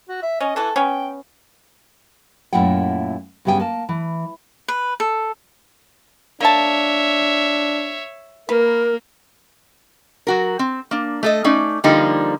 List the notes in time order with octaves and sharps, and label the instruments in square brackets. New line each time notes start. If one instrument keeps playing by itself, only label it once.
[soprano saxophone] F#4
E5
[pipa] C#4 [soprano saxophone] D#5
[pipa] E3 F#4 [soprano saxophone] A4
[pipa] B3 C#4 [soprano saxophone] G5
[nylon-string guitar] F#2 A#2 A3 E4 F#5 G5
G2 C#3 G3 B3 G5 G#5
A#3 A5
E3
[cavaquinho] B4
A4
[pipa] A#3 A5 [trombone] D4 [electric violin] C#5 E5
[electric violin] A#3 [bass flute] A#4 [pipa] B4
[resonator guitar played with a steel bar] F#3 F#4 A#4
C4
A#3 D4
A3 A4 D#5
A3 C#4 D#4 D5
D3 F3 G3 A#3 D#4